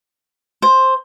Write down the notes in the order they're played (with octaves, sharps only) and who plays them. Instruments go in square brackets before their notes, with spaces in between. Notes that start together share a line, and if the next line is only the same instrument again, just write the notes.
[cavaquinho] C5